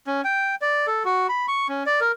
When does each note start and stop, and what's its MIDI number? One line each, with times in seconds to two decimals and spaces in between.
0.07 0.21 61
0.24 0.55 79
0.62 0.86 74
0.87 1.03 69
1.05 1.27 66
1.29 1.46 83
1.48 1.67 85
1.69 1.83 61
1.86 2.00 74
2.01 2.12 70